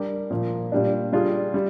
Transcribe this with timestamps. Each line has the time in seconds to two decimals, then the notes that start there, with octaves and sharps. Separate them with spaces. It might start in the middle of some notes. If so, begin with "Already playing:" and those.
Already playing: G3 D4 G4 A#4
0.31 A#2 F3 A#3
0.72 A#2 G3 D4
1.13 G3 D4 F4 G#4
1.54 G3